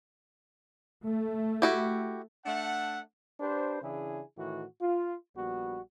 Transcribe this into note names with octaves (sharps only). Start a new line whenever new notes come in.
A3
E4 F#4 G4
A3 D4 E5 F#5
D4 G4 B4 C5
C#3 E3 D4 E4 G#4
A2 D#3 E3 F#4
F4
A#1 G3 B3 F#4